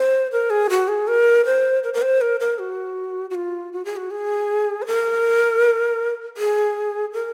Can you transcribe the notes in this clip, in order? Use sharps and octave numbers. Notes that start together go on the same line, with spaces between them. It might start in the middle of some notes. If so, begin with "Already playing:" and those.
Already playing: C5
A#4
G#4
F#4
G#4
A#4
C5
A#4
A#4
C5
A#4
A#4
F#4
F#4
F4
F#4
G#4
F#4
G#4
C5
A#4
G#4
A#4